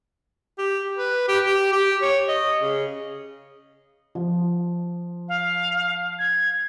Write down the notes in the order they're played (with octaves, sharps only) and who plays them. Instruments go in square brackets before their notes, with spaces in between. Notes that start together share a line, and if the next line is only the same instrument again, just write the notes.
[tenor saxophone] G4
B4
G4
G4
G4
C#5
D#5
C#3
[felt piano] F3
[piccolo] F5
G#6